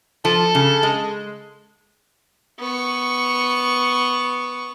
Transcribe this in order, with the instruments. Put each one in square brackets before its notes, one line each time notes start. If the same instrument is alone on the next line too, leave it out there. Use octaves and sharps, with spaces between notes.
[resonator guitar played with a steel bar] F3 [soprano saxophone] A4
[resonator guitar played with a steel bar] C#3
G#3
[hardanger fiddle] B3 C#6